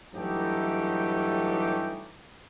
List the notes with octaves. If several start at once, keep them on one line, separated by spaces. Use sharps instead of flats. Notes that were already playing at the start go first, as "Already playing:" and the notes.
G2 E3 F#3 A3 D#4 G4